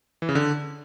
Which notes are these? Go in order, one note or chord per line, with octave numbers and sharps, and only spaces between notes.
E3
C#3
D3